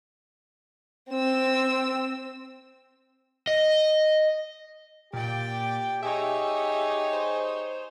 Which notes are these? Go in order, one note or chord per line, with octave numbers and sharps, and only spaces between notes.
C4 E6
D#5
A#2 G4 D5 G5
D#4 G4 G#4 C#5 E5
C5